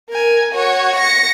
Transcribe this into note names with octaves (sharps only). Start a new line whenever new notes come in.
A#4 G#5
F#4 C#5
A#6 C#7